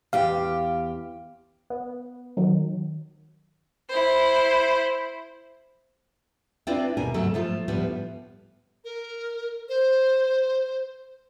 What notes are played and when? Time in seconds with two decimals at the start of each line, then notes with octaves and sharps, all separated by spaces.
0.13 E2 G4 F5
1.70 B3
2.37 D#3 F#3
3.89 E4 C5
6.67 C4 D4 E4 F4 B4 D5
6.97 D#2 B2 A#4 G#5
7.14 D2 G#2 C#3 F#3 A3 A4
7.34 F3 A3 F4
7.68 D2 A2 F3 G3 B3
8.84 A#4
9.69 C5